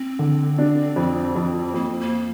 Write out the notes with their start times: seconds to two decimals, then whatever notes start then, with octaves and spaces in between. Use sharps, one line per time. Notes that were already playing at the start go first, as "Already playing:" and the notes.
Already playing: C4
0.19 D3
0.58 D4
0.96 F2
1.36 F2
1.74 F2 A#3
2.00 A#3